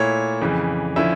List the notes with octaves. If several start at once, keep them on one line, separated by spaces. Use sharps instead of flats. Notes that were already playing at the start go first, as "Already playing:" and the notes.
Already playing: A#2 A3 E4 C#5
F2 C#3 E3
D3 F3 C#4 E4 E5